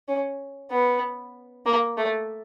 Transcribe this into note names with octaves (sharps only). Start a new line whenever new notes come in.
C#4
B3
A#3
A3